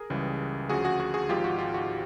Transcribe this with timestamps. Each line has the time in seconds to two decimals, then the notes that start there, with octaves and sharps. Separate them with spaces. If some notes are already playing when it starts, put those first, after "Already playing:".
Already playing: G#4 A#4
0.10 C#2 C#3 E3 G3
0.69 D2 C#3 F3 F#4 G#4
0.84 F#4 G#4
1.00 F#4 G#4
1.14 F#4 G#4
1.29 G#1 G#2 F3 F4 G4
1.44 F#4
1.59 F4
1.74 F#4